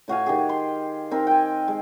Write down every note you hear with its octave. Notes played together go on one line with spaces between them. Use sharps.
A2 F#4 F5 G#5
D#3 G4 G#4
C6
C4 D#4 A#4
G5 G#5
G#3